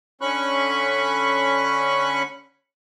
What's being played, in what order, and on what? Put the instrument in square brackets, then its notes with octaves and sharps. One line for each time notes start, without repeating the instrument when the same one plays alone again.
[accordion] D3 C#4 B5 C#6 F#6